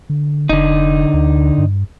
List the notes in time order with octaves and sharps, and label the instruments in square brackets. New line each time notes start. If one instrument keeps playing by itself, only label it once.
[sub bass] D3
[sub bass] F1 [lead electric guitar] D3 D#4
[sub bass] D2
G2